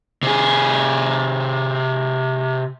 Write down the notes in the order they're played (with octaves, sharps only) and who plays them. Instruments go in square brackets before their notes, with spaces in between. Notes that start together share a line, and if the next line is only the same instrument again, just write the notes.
[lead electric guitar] C3 G#4